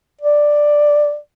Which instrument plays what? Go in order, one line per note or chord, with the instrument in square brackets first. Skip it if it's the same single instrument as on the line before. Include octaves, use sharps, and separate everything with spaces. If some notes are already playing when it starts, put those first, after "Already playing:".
[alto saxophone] D5